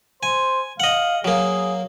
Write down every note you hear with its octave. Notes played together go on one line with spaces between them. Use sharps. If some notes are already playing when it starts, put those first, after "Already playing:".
C5 G#5
D#5 F5 F#5
F#3 A#3 G#4